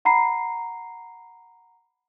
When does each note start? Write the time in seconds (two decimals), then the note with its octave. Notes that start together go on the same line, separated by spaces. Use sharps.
0.05 F#5 A#5 B5 C7